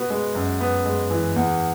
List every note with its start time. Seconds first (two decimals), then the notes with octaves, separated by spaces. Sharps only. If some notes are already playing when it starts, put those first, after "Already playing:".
Already playing: B2 B3 F#4
0.10 G#3
0.35 F#2
0.61 B3
0.85 G#3
1.11 E3
1.36 E2